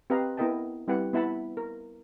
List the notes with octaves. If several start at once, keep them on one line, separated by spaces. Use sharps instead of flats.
C4 G4 B4 D#5 F5 A#5
B3 E4 A#4 D#5 G5 A5
G3 C4 E4 G4 B4 F#5
B3 E4 E5 F#5 A5 B5
A#4